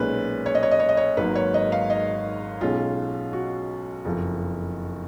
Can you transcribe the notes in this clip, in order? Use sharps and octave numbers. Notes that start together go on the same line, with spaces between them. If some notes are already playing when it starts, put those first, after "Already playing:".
Already playing: B1 A#2 G#3 C#4 B4
C#5
D#5
C#5
D#5
C#5
D#5
C#5
G#1 G#2 F#3 A#3 B4
C#5
D#5
F5
D#5
B1 B2 G#3 C#4 F4
F#4
F#1 F2 F3